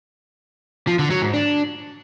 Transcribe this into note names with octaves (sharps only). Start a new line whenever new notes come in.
F3
D3
F#3
G#2
D4